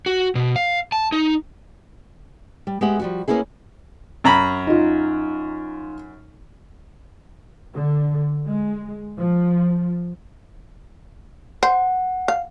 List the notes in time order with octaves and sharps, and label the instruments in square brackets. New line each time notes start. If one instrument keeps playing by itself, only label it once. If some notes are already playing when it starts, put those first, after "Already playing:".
[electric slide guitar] F#4
B2
F5
A5
D#4
[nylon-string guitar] G3
G#3 B3 G4 E5 F#5
F3 G3 F#4
A#3 B3 C#4 E4 G#4
[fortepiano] F#2 A#5 B5
[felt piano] D#4 F4
[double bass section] D3
G#3
F3
[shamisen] C5 [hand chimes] F#5
[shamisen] F5